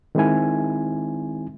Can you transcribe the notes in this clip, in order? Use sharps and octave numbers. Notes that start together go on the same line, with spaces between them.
D#3 G#3 C4 D#4 E4 G#5